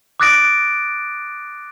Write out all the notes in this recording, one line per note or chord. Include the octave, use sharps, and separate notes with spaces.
D6 D#6 F#6 A6 A#6 D7